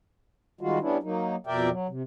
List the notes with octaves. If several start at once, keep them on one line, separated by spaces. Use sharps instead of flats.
D#3 G3 G#3 F4 F#4
G3 B3 C#4 D4 E4
F#3 A#3 D#4
F2 B2 A#4 D5 E5 G5
F#3
C3